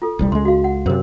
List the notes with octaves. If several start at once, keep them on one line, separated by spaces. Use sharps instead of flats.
F4 A4
D#1 C2 G3
C#2 G#3 C6
F#4 F5
F#5
F#2 C3 A#4 C5 C#5